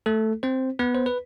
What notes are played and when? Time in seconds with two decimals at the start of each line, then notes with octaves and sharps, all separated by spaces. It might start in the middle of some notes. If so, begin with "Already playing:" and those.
0.06 A3 A4
0.43 C4 C5
0.79 B3 B4
0.95 C5
1.06 B4